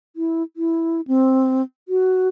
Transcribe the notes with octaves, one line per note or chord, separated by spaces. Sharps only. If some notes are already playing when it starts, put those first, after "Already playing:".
E4
E4
C4
F#4